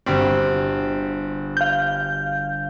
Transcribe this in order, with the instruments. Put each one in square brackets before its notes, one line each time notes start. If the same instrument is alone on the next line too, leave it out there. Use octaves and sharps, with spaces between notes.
[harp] G1 F#4 G4 [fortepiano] G2 C4
[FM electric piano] F5 G6